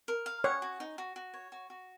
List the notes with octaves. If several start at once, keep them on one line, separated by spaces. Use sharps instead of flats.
A#4
F5
C#5 F#5
F#4
D#4
F#4
F#4
C#5
F#4
F#4